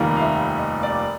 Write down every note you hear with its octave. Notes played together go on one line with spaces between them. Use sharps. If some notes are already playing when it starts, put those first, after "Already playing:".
Already playing: F1 D#2 D#3 G3 A#3
F5
E5
D#5
D5